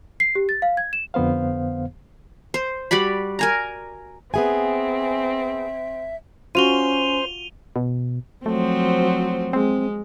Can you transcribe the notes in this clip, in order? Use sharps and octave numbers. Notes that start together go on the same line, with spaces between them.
C7
G4
A6
F5
G#6
E7
F2 D3 B3 C5 F5
C5
G3 F#4 D5 B5
A#4 G#5 A#5
B3 C4 G#4 E5 G#5
C#4 F4 F#4 C5 D#7 F7 G7
B2
F3 F#3 A3 C4
G#3 C4